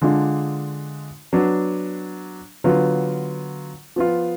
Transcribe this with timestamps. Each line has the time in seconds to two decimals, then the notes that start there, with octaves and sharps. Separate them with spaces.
0.01 D3 G#3 D4 F4
1.32 F#3 B3 D4
2.64 D3 F#3 B3 F4
3.96 F3 B3 F4